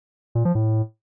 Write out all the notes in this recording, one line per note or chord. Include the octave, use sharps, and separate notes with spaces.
A#2
F3
A2